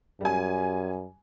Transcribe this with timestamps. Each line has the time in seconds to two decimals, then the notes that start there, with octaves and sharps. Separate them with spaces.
0.21 F#2 G3 G#5